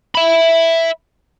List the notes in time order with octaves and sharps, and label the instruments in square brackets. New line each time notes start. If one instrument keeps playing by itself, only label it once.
[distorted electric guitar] E5 B5